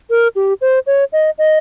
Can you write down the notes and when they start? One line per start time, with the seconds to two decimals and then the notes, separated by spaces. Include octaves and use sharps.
0.10 A#4
0.36 G4
0.61 C5
0.87 C#5
1.13 D#5
1.38 D#5